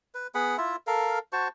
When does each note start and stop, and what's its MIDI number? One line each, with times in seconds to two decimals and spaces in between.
0.15 0.27 71
0.35 0.57 59
0.35 0.57 68
0.35 0.57 78
0.35 0.57 83
0.58 0.76 64
0.58 0.76 65
0.58 0.76 76
0.87 1.19 69
0.87 1.19 70
0.87 1.19 77
1.33 1.48 66
1.33 1.48 72
1.33 1.48 81
1.33 1.48 85